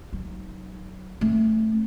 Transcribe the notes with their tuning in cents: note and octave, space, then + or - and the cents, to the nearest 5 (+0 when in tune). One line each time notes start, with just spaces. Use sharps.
F#3 +15 D#4 +0
A3 +0 C#4 -40